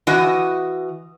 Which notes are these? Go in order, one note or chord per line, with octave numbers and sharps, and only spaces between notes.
E3 F#4 D#5